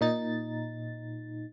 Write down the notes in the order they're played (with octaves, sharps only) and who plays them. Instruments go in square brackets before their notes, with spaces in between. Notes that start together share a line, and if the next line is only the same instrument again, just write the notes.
[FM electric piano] A#2 D#4 A6